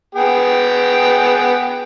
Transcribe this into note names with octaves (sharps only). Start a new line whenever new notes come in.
B3 G#4 G5